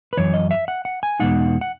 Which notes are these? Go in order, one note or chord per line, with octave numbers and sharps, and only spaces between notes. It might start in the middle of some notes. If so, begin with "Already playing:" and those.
B4
F#2 E3 C#5
D#5
E5
F#5
F#5
G#5
E2 B2 G#3 D#4 F#5
F#5